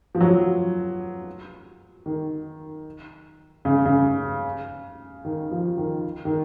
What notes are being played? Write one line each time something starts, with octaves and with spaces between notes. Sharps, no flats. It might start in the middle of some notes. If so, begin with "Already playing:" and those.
F3
F#3
D#3
C#3
C#3
D#3
F3
D#3
D#3